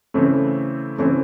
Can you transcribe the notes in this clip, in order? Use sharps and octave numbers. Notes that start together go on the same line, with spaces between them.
C#3 E3 A3 C4
C#3 E3 A3 C4